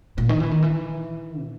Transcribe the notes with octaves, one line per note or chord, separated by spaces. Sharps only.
A#2
D#3
E3
D#3
E3
A#2